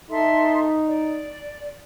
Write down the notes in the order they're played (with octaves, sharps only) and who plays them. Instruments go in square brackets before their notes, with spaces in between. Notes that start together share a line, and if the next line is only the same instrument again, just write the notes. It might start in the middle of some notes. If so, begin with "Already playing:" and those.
[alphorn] D#4 [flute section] A4 E5 C6
[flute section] D5